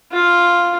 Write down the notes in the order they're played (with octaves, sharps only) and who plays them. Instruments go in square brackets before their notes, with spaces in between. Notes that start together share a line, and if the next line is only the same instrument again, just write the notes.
[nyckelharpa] F4